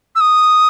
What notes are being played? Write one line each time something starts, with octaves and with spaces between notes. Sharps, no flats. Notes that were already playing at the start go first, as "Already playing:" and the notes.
E6
D#6